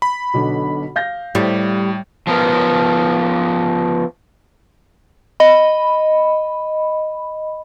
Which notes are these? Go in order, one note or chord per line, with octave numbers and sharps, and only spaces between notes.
B5
B1 B2 D3
F5 G6 A#6
A2 G3
F3 B3 A#4
D#5 B5